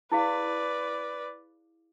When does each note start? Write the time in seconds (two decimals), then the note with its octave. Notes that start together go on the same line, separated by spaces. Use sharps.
0.12 E4 G#4 B4 D5 F5